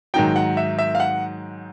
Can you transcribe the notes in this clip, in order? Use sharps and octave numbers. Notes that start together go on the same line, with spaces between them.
G#2 D#3 F#3 G5
F#5
E5
E5
F5
F#5